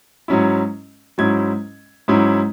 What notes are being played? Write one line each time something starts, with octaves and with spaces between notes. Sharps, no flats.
G#2 F#3 C#4 E4
G#2 F#3 C#4 E4 G#6
G#2 F#3 C#4 E4